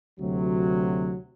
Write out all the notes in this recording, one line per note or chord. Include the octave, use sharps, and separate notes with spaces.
D2 C3 F#3